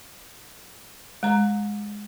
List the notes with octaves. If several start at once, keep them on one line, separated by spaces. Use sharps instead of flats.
G#3 A#5